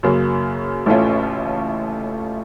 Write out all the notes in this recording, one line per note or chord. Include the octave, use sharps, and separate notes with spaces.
F#2 C#3 F#3 A#3
A1 A2 A3 C#4 F4